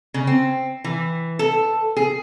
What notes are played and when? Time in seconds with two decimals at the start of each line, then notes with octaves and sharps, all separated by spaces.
0.14 C#3
0.27 C4
0.84 E3
1.39 A4
1.97 G#4